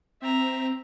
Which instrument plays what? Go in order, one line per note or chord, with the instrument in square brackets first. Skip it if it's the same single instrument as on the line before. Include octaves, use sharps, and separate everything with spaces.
[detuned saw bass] C4 [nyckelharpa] E5 A#5